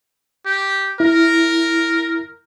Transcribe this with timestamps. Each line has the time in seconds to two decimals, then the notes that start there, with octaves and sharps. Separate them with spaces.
0.46 G4
1.00 E4 A#4